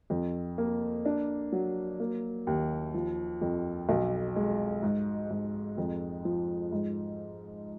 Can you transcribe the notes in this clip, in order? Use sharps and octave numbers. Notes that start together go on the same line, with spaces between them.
F2
A#3
D4
F#3
A#3
D#2
F3
F2
B1
G#3
G#2
G#2
F2
F3
G#2